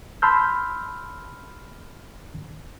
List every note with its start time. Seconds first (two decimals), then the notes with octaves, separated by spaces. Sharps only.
0.22 A5 B5 C6 E6 F6 G6